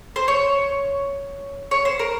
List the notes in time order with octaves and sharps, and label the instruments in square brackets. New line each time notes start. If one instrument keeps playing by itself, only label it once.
[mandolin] C5
C#5
C#5
C5
A#4